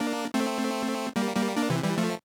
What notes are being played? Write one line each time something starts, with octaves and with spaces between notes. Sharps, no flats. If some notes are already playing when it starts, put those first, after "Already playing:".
Already playing: A#3 D4
A3 C4
G3 A#3
G3 A#3
A#3 D4
C3 E3
E3 G3
F3 A3